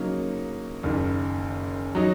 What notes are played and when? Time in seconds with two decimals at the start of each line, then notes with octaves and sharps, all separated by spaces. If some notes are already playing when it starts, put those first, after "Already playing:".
Already playing: C#3 F#3 A#3 D#4
0.83 F#1 F#2 D#3
1.95 F#3 D#4